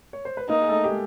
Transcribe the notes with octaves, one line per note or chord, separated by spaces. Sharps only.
C#5
C5
B4
A#3 D#4 A#4
G#4
A3 A4
G4
G#3 G#4